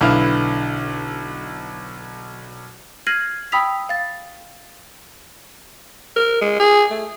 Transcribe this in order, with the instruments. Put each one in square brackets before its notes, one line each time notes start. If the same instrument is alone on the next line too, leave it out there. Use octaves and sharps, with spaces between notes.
[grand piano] B1 D3 E4 B4 F5 F6
[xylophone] F6 G#6 A#6 C7 D#7 F#7
G5 B5 D#6 E6 B6 F7
F5 A6
[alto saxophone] A#4
G#3
G#4
A3